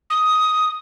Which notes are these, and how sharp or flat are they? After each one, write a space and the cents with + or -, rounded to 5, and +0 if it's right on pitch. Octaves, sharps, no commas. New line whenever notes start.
D#6 +10